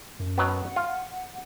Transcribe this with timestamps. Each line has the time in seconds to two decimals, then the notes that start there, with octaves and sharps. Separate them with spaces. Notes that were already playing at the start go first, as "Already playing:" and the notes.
0.20 F#2
0.38 B2 F#3 B3
0.62 F#5
0.76 F4